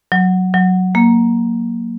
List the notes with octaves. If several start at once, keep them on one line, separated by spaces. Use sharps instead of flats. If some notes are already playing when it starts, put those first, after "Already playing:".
F#3
F#3
A#3